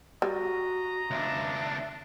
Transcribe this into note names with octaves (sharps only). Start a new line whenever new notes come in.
G3 F#4 D#5 A#5
C#2 D4 E5